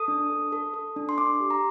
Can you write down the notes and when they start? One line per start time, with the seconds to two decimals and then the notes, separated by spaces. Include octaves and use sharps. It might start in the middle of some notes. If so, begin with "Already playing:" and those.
Already playing: A4 D#6
0.08 D4
0.30 A4
0.52 A4
0.74 A4
0.96 D4
1.09 C6
1.18 D4 D6
1.40 G4
1.50 A#5